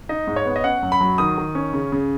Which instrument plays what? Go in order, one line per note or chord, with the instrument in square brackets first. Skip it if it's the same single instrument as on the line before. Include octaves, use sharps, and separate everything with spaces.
[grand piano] D#4 D#5
G#2
C#5
B3
D#5
C#4 F#5
F#2
B5
F#3
D#3 D#6
D#3
C#4
C#3
C#3